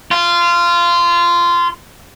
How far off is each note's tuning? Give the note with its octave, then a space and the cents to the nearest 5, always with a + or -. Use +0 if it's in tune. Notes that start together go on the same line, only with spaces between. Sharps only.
F4 -20